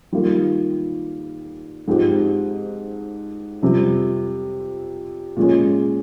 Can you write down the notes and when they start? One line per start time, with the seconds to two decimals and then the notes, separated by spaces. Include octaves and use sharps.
0.12 D#3 G3 A#3 F4
1.88 G#2 F3 C4 D#4 G4
3.62 F2 C3 G3 C4
5.37 A#2 G#3 C#4